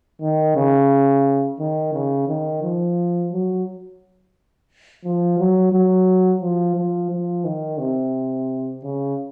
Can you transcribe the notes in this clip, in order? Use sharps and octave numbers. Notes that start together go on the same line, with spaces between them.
D#3
C#3
D#3
C#3
D#3
F3
F#3
F3
F#3
F#3
F3
F3
F3
D#3
C3
C#3